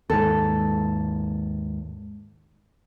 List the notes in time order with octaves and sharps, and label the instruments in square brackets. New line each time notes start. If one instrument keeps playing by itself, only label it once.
[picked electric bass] D#2 G#2 [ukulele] A4